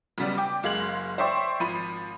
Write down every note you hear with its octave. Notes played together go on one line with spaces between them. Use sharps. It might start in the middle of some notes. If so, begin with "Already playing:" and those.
B1 C#3 G3 B3 D5
G5 D6
F#1 G#3 F5 G#6 F#7
C5 D5 E5 G5 C#6
G#1 F3 B5 D#7